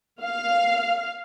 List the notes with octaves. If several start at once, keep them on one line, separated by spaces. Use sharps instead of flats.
F5